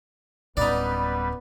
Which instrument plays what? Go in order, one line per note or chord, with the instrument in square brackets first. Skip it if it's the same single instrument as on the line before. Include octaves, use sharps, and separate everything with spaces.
[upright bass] D1 C#4 [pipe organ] G3 B4 [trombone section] B3 [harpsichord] D#4 D5